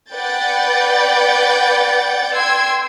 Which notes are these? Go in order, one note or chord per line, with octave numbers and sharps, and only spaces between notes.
B4 D5 F#5 G5 G6 A6
G5 C6 E6 G#6